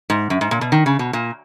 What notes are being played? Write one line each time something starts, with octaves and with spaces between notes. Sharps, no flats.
G#2
F#2
G#2
A#2
B2
D#3
C#3
B2
A#2